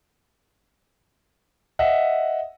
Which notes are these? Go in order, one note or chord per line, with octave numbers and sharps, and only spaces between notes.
D#5 E5 F#5